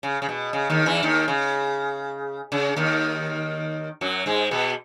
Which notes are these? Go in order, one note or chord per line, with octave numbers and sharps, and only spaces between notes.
C#3
C#3
B2
C#3
D#2 D#3
E2 E3
D#2 D#3
C#3
C#3
D#2 D#3
F#2 F#3
G#2 G#3
B2 B3